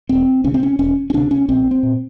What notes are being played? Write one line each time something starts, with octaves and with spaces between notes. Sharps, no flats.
E1 C4
D2 C3 C#4
C4
C#4
E1 C#4
C#4
D2 C3 D4
C#4
A#1 C4
C4
A#2